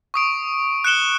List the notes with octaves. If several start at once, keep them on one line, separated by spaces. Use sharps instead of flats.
C#6 D#6 D7
F#6 C#7 E7 G7